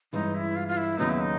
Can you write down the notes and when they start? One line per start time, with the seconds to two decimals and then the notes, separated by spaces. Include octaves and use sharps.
0.13 G2 E3 G#3 C#4 D#4
0.35 E4
0.56 F4
0.68 F4
0.77 E4
0.98 D#2 C#3 F#3 B3 D#4
1.09 E4
1.20 D#4